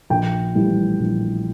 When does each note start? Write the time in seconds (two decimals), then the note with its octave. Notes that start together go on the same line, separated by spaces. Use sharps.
0.10 A#1 G5
0.55 A2 E3 G3
1.00 A#1